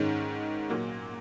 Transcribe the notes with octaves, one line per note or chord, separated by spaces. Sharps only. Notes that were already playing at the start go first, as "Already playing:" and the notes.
Already playing: G#2 D#3 G#3 C#4
A#2 F#3 A#3